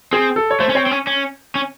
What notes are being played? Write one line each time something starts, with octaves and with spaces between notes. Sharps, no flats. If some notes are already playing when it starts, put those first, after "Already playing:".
C4 G#4
A4
C#5
A3 C5
C#4
C4 C#5
C4
C#4
C#4
C#4